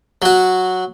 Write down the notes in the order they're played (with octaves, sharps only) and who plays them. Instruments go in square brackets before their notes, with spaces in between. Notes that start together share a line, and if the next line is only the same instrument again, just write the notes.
[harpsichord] F#3 F#4